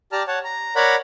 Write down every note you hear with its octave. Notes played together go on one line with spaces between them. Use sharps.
G4 D5 A5 A#5 F6
C#5 F#5 A5
A#5
A#4 C#5 D5 F#5 A#5 B5